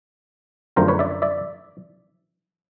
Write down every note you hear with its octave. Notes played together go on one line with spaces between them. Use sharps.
F#2 D3 F3 A3 C4 A#4 C5
B4 C#5
D5 E5
D5 E5